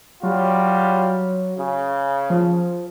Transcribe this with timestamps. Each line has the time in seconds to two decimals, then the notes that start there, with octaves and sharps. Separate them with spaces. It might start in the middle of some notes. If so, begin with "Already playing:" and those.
0.23 F#3 G3 F4 F#4
1.59 C#3
2.30 F3